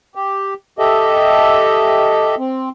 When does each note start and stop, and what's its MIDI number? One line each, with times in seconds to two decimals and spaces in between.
0.15 0.54 67
0.79 2.35 67
0.79 2.35 69
0.79 2.35 75
0.79 2.35 76
2.38 2.69 60